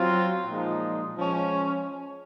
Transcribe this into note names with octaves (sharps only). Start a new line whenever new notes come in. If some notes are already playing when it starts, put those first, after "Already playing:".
Already playing: F#3 C4 F4
A#2 F3 G#3 D#4
F3 G#3 C#4